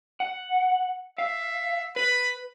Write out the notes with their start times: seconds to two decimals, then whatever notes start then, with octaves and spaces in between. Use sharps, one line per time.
0.20 F#5
1.18 E5 F5
1.96 B4 B5